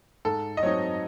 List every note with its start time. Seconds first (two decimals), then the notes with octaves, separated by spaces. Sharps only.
0.25 G#2 A4
0.57 D#5
0.63 F#3 C4 D#4 C#5